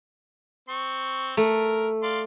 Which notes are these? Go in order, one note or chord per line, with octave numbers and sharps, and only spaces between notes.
C4 C#6
A3 A#4
D5 F5 C6